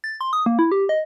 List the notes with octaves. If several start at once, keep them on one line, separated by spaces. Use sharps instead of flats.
A6
C6
D#6
A#3
E4
G4
D#5